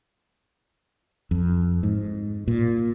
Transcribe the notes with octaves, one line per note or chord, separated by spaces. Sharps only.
F2
G#2
A#2